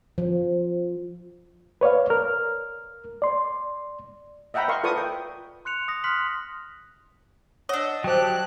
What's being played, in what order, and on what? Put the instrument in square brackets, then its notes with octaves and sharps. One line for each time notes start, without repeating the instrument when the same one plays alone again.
[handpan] F3
[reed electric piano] B4 C#5 D5 F5
A#4 F6
D5 C6
[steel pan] D#5 E5 F#5 G5 A#5 B5
A#4 D#5 F5 C6 C#6
F4 A4 B4 D5 C#6 D#6
G5
[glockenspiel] C6 F#6 C#7 F7
D#6 A#6
C6 F6 F#6 B6 F#7
[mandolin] D4 D#5 [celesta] C#5 [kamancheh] F#5 E6
[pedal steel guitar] F#3 G4 [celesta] C5 G5 [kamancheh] A5 F#6